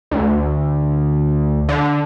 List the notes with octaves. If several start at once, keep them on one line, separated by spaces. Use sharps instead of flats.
D2
D3